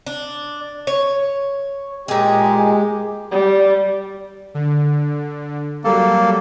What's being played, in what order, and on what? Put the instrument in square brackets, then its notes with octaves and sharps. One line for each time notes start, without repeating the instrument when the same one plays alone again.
[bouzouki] D4
C#5
[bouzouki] A#2 G#4 [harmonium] G#3 G4
[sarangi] G3
[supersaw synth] D3
[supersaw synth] F#3 G3 A4 [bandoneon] A#3